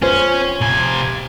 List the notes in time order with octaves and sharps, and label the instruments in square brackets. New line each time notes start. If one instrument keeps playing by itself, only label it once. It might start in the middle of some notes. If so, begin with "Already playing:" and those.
[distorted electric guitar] C#4 [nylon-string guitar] F4 C5
[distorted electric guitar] C3 G#5